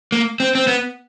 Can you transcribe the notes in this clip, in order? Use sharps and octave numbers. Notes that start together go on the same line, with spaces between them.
A#3
C4
C4
B3